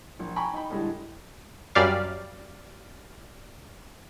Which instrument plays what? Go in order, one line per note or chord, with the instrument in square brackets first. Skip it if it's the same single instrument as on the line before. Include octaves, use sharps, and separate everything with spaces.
[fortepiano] A#1
G5 G#5 A#5 B5 C#6
D#4 G5 B5
A2 D3 G3 G#3
[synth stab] F#2 G3 D5 F5